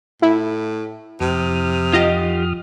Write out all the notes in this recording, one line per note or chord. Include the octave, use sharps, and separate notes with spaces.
A2 E4
F2 C3 D#6 F6
F4 G4 D#5